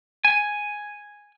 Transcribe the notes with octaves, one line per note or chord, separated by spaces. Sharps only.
G#5